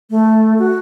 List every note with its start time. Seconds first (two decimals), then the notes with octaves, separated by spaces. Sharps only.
0.10 A3
0.59 F#4